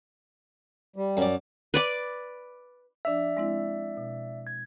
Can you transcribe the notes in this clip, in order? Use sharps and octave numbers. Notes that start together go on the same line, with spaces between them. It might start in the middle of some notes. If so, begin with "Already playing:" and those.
G3
F#2 D5
B4 D5 D6
F3 D4 D5 E5 E6
G#3 C4 E4
B2
G#6